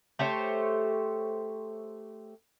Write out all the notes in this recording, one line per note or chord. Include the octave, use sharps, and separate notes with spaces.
A3 G4 C5 C#5